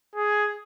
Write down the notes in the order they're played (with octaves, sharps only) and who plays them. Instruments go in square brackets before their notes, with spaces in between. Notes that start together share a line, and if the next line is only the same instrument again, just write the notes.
[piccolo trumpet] G#4